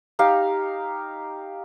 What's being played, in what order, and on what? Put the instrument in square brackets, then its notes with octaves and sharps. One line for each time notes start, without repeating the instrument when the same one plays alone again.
[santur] D#4 G4 F5